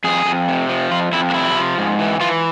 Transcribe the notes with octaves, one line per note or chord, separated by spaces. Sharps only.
F2 G#4
F2
C3
F3
F2 F4
F2 E4
D4
C3 E4
F3
G#2
E3
E3 F4